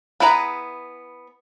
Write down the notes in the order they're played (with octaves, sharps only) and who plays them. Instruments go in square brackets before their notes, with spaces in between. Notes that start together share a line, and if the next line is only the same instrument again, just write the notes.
[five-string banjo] B3 E4 G#4 B4 A#5